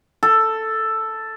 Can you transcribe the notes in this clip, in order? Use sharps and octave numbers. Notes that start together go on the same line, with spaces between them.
A4